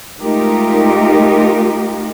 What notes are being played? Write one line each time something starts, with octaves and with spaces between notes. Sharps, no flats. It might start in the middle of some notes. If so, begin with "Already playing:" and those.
G#3 A3 D#4 F4 G4 A#4